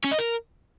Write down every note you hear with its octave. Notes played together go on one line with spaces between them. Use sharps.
C#4
D#5
A#4